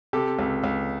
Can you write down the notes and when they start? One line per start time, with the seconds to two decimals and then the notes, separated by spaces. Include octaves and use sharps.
0.13 C3 G4 A4
0.39 C#2
0.64 C#2